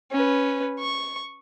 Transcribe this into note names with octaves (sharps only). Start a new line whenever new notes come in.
C#4 B4
C#6